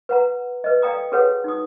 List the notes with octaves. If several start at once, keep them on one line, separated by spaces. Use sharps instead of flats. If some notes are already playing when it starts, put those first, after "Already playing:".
B4 F#5 A#5
B4 D#5
A4 D5 F5 G5 A#5 D#6
F#4 G#4 A4 B4 C#5 F#5
D#4 F#4 D#6